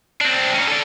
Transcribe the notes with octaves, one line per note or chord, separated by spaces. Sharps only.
C4 D4
C#4 D#4
A4 D5